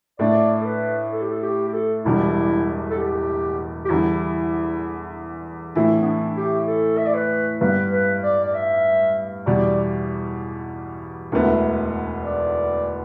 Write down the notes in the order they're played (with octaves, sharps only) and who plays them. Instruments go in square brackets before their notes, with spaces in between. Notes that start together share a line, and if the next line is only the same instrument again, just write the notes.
[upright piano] A2 A3 D4 [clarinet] D5
[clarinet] A4
B4
A4
G4
A4
G4
G4
A4
[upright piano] E1 E2 B2 G3 D4 [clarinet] E4
[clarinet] A4
G4
G4
[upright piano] E2 D3 G3 [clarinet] E4
[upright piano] A2 E3 A3 E4 [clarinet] D4
[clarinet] B3
D4
G4
A4
E5
D5
B4
[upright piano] G2 G3 B3 [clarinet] B4
[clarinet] B4
D5
D5
E5
[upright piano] E2 B2 G3 [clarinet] D5
[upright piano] E1 D2 D3 B3 E4
[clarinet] D5